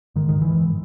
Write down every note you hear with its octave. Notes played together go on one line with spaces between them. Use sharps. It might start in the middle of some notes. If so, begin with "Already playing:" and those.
G#2 D#3
D#3
G#2
E3
G#2